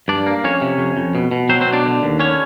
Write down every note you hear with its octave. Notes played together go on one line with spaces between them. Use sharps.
G2 D4 D5
A#3
F2 C#4 C#5
C3
F2
F2
B2
B2
F#3 C4 C5
C4 C5
B2
D4 D5
D3
D#2
D3 C#4 C#5